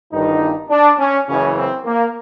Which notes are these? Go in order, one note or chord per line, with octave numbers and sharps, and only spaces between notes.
G1 G2 D#3 D#4
D4
C#4
F#1 F#2 C#3 E3 C#4
C4
A#3